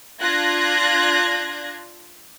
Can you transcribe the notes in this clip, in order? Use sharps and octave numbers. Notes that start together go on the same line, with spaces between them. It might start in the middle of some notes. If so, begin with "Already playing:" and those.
D4 F4 F#6 G#6 A#6